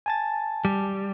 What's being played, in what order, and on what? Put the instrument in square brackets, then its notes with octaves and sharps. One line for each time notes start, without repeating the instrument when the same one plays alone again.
[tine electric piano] G#5 A5 A6
[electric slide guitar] G3